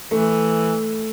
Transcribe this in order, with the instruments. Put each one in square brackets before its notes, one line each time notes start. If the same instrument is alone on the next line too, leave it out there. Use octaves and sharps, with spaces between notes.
[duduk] E3 [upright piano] A3